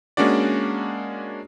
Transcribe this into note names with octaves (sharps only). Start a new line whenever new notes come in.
G#3 A#3 C#4 D4 F#4 D5